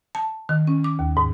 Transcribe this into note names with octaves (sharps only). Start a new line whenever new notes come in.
A5
D#3
C#4
D6
D#2
G#2